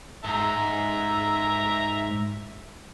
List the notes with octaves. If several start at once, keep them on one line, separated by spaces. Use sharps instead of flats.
G#2 E5 A#5